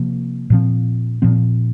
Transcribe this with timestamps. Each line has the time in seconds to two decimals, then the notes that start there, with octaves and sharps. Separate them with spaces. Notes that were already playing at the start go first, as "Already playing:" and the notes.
Already playing: C3 F3 A#3
0.50 A#2 F3 C4
1.22 A#2 F3 C4